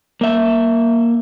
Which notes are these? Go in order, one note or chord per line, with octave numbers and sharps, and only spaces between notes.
A#3 E5